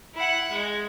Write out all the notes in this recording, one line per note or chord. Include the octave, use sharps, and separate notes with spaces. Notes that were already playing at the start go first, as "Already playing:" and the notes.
E4 F#5
G#3